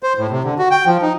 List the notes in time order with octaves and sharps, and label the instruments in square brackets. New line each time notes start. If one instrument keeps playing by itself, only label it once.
[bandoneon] C5
A2
C3
D3
F#4
G5
F3
D#4